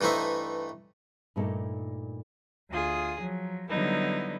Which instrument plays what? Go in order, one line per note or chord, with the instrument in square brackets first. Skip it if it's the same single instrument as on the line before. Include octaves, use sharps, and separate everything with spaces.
[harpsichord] G2 E3 A3 D#4 C5 E5
[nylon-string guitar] G2 A#2 A3 A#3 D#4 A4
[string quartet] D2 F4 G#4 D#6
F3 F#3
D3 F#3 G3 B3 D#4 E4